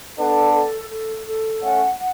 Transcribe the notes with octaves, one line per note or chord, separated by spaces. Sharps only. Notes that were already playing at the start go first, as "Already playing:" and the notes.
B3 D4 A4
A4
A4
A4
A3 C#4 F#5
F#5